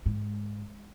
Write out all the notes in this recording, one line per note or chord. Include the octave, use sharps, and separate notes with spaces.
G#2